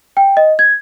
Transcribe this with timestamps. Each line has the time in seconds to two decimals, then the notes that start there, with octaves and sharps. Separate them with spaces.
0.17 G5
0.37 D#5
0.59 G#6